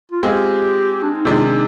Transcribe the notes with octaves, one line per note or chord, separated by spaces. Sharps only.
F4
G#3 C4 F4 G4 G#4
D4
D#4
C3 D#3 G#3 D4 F4
D#4